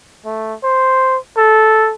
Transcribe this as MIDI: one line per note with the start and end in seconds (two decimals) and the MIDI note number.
0.25 0.54 57
0.63 1.18 72
1.37 1.93 69